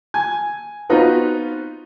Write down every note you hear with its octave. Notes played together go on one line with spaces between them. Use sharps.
G#5 G#6
B3 C4 D#4 F4 F#4 B4